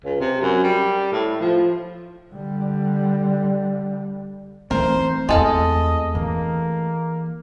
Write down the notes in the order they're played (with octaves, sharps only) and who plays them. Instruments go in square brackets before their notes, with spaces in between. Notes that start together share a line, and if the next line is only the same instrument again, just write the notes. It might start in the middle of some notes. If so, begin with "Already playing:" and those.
[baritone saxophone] C#2
C3
F#2
G3
A2
F3
[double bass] D3 G3
[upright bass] E3 D#4 [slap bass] A3 C4 [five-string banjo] A#4 [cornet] C5
[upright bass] E2 E4 [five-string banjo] G#3 A4 F5 [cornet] D#5
[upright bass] E3 [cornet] A#3